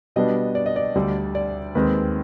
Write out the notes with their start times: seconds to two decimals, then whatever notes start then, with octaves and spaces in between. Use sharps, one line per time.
0.16 B2 G3 B3 D4 D#5
0.55 D5
0.66 D#5
0.76 D5
0.95 D2 D3 G3
1.35 D5
1.75 D#2 D#3 G#3 C4 B4